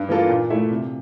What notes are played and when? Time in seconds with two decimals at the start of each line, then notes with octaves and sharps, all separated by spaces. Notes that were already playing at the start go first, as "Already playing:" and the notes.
Already playing: G2
0.09 E3 A#3 F4 A4
0.29 A#2
0.50 A3 E4 A4 E5
0.71 C3